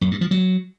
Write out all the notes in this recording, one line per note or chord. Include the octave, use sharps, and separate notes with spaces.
F#2
G2
F3
F#3